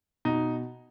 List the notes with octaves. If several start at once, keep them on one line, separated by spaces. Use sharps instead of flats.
B2 D#4